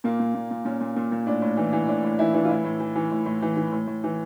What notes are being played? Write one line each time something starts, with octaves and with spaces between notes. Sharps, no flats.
A#2 A#3
A#2
A#2
A#2
A#2 C#4
A#2
A#2
A#2
A2 D4
A2
E3
E3
A2 D4
A2
E3 E4
E3 D4
F4
A2 E4
A2
E3
E3
A2
A2
E3
E3
A2
A2
E3